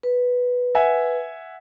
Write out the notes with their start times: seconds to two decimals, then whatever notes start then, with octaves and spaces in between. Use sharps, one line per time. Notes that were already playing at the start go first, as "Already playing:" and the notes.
0.03 B4
0.75 E5 F#5 G#5